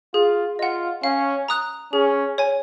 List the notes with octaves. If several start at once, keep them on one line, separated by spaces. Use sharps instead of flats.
F4 G#4
F4 D#5 F#5
C#4 F5
A#5 D#6 F#6
C#4 G#4
C#5 G#5